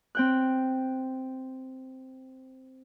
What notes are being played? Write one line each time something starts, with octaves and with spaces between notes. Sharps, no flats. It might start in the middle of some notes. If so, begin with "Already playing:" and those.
C4 G5 F#6